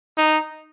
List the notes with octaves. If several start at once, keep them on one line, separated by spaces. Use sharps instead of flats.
D#4